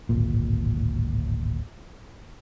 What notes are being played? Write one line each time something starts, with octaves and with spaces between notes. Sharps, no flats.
D1 G#1 A#2